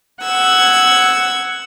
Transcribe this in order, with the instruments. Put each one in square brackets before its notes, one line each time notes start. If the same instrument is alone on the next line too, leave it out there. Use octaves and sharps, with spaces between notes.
[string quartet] F#5 E6 G#6